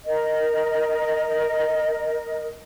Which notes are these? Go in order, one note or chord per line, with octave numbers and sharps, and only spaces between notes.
A#4 D#5